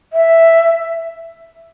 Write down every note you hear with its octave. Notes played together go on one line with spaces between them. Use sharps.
E5